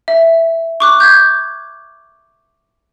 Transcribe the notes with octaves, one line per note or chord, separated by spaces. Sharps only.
E5
C#6 D6 F#6
G6 G#6